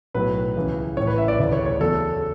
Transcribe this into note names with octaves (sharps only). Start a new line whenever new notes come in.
B1 A2 F#3 B4
C#2 C#3 E3
A1 A2 E3 C#5
B4
E5
D5
D2 C#3 E3 D5
C#5
C#5
E2 C#3 F#3 A4